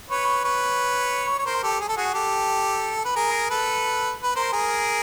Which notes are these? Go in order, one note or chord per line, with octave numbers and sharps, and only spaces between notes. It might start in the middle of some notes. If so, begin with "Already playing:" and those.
B4 C#5
B4 C#5
C#5
A#4 C5
G4 A4
G#4
A4
F#4 G#4
G4 A4
B4
G#4 A#4
A4 B4
B4
A#4 C5
G#4 A#4